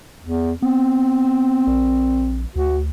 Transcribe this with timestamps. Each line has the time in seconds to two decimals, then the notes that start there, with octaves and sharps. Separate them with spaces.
0.22 E2
0.62 B3 C4
1.67 A#1
2.56 D2 F#4